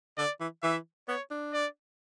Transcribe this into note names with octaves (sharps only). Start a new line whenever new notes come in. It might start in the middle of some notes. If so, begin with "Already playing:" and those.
D3 D5
E3
E3 E5
B3 C#5
D4
D5